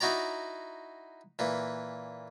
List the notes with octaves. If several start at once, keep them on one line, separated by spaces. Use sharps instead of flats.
D#4 E4 F#4 D5 A#5
A#2 E3